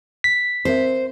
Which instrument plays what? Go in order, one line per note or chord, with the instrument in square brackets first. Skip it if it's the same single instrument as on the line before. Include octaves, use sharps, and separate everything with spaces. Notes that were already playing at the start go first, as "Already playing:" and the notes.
[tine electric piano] B6
[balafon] C4 A#4 E5 [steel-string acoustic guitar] C5